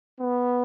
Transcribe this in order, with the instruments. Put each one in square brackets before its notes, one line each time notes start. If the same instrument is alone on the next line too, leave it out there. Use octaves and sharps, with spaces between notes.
[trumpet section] B3